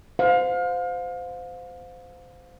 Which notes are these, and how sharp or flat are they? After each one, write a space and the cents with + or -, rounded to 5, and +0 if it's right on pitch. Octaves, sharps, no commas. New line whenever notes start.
C5 -20 F5 +30